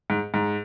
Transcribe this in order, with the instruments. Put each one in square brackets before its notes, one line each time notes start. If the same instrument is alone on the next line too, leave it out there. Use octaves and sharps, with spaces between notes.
[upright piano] G#2
G#2